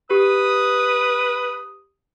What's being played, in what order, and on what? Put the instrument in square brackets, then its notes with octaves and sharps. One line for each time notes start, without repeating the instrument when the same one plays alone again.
[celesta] G4 [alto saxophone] B4 [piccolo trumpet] D#6